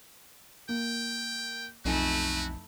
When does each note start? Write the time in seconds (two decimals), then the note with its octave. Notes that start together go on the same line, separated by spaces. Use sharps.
0.69 A#3 G5
1.85 B1 F2 A3 D#4 E4 F#4 G#5